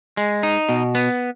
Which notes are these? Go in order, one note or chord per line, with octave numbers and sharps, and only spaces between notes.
G#3
D#4
B2
B3